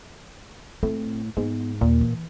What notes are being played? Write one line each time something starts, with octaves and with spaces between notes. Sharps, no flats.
A2 C4
G#2 B3
D#2 A#2
E3